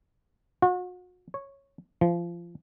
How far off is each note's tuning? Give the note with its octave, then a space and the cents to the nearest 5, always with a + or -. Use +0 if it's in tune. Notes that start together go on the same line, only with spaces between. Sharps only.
F#4 -40
C#5 -5
F3 -25